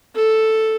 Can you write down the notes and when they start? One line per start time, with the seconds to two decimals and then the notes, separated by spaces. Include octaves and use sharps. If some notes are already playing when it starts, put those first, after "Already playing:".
0.15 A4